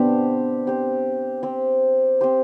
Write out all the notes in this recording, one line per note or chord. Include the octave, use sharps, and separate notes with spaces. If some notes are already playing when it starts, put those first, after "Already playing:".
Already playing: B3 C4 D4 G4 C5
C4 G4 C5
C4 G4 C5
C4 G4 C5